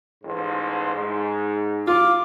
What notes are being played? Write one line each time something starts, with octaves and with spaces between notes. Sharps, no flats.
A1 G#2 C5
G#2
F4 D6